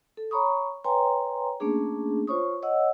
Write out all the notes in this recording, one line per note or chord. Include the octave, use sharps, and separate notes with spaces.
A4
C#5 A#5 B5 C#6 D#6
B4 C#5 G5 G#5 A#5 C6
A3 A#3 C#4 D4 G#4
F4 C5 C#5 C#6 D#6
C#5 D#5 F#5 E6